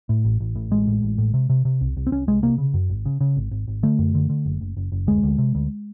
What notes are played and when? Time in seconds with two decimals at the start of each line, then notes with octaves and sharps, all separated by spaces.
0.09 A2
0.25 A1
0.40 A1
0.55 A2
0.71 A1 G#3
0.87 A2
1.03 A1
1.18 A2
1.34 C3
1.50 C3
1.65 C3
1.81 C2
1.97 C2
2.07 C4
2.11 C2 C#4
2.27 C2 G#3
2.42 C3 A#3
2.58 C#3
2.74 F#2
2.90 G#1
3.06 C#3
3.21 C#3
3.37 G#1
3.51 G#1
3.68 G#1
3.83 D3 A3
3.99 F#2
4.15 D3
4.30 D3
4.46 F#1
4.61 F#1
4.77 F#1
4.92 F#1
5.07 D2 G#3
5.23 D2
5.38 C3
5.55 D2